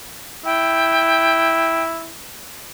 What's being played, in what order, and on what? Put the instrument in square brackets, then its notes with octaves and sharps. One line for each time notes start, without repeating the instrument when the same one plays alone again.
[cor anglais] E4 [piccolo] G5